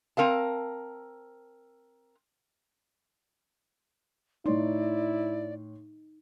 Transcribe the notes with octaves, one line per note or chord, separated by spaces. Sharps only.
C4 A#4 F5 A5
A2 D#4 E4 C#5 D5 C6